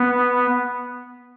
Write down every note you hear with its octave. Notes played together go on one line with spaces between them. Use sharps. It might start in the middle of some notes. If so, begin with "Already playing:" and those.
Already playing: B3